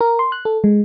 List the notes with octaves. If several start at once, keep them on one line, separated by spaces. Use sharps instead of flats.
A#4
C6
F#6
A4
G#3